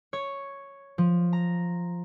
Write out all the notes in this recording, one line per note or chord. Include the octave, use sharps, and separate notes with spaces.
C#5
F3
A#5